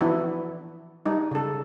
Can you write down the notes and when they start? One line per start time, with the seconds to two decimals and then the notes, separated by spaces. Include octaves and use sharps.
0.01 E3 F3 B3 D4 E4 F#4
1.05 G3 D4 D#4
1.31 C#3 A4